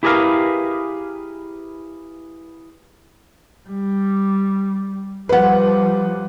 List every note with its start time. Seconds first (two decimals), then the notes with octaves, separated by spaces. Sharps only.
0.03 E4 G4 G#4 A#4 B4 F5
3.68 G3
5.29 F3 G3 B4 F#5